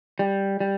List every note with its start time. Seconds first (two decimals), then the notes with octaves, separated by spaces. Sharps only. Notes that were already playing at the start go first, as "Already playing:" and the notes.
0.19 G3
0.60 G3